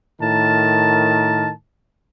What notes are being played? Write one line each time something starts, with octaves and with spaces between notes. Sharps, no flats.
A2 D#3 A#4 A5